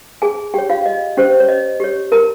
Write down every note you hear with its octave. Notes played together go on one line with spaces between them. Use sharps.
G#4 G#5
G4 C#5 G5
F4 F5
D#5
C#4 G4 C5
C#5
D#5
G4 C#5
A#4 A#5